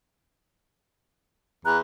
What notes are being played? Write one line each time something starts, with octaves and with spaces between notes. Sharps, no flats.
E2 A#5 F#6